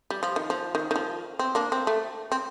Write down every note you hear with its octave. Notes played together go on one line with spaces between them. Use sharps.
G3
F3
D#3
F3
D#3
D#3
F3
C4
A#3 D4
C4
A3
C4